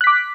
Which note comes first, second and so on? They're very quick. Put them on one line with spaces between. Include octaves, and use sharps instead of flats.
F#6 B6 D6